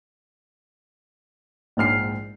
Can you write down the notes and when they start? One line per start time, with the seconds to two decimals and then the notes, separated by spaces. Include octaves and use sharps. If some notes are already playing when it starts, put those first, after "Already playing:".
1.77 A#1 G#2 F6 C7